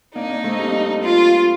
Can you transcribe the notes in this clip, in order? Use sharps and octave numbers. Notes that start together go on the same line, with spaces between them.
A#3 D4 D#4
A#3 D4
A3 C4
G3 A#3
F4